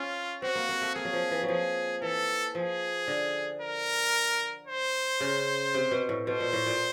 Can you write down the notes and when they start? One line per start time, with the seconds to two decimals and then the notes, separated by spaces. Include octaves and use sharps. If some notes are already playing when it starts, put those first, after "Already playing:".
Already playing: C#4 F4
0.42 C4 F#4
0.55 A#3
0.69 A#3
0.82 A3
0.95 A#3 G#4
1.05 F#3
1.13 F3
1.31 E3
1.43 F#3
1.48 F3 G#4
2.02 E3 A4
2.55 F3 G#4
3.08 D3
3.61 A#4
4.67 C5
5.21 C#3
5.74 C3
5.91 B2
6.09 A2
6.27 B2 C5
6.40 A#2
6.53 A2
6.66 A#2